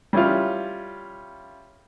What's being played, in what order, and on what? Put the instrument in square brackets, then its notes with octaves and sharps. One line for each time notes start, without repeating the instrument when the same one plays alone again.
[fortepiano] G3 C#4 E4 F4